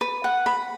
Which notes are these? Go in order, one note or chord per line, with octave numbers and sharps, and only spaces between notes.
B4
F#5
B5